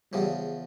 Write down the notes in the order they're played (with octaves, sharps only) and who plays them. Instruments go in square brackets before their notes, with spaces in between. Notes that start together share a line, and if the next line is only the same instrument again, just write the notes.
[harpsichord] E2 C#3 F3 [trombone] G3